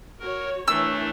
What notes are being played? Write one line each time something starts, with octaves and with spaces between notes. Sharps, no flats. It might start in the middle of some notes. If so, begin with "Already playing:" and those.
F#4 A#4 C#5
E3 A3 D4 A#4 C#5 E6